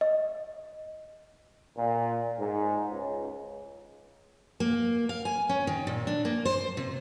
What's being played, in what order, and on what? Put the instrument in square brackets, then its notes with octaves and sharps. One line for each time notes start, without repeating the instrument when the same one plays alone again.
[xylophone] D#5
[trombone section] A#2
G#2
C#2
[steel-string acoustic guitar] A#3
F5
G#5
C#4
D#3
A#2
D4
A#3
C5
C3